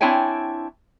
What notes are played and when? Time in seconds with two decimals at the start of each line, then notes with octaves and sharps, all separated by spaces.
0.01 C4 D4 E4 C#5 G5 G#5